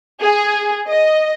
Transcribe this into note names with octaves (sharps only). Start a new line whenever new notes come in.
G#4
D#5